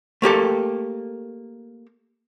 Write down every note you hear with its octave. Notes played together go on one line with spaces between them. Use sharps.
A3 A#3 G4 A4